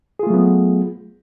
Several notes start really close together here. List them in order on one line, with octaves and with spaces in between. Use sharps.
G#4 F4 A3 F#3 B3